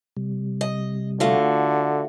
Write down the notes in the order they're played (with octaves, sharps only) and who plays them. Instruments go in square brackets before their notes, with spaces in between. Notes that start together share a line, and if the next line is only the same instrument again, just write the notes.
[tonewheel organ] C3 G3
[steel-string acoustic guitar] D#5
[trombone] D3 [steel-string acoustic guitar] A3 F4 F#4